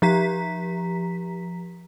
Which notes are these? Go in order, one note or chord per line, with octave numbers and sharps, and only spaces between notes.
F3 G4 A#5 B6